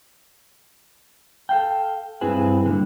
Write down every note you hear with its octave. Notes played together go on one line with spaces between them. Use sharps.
A4 F5 G5
G2 C4 E4 G#4 B4 G#5
D3 G3 A#3